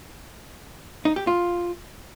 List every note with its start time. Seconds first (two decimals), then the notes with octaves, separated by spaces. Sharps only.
1.05 D#4
1.16 G4
1.27 F4